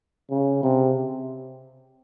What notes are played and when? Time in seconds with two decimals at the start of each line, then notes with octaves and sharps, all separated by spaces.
0.30 C#3
0.63 C3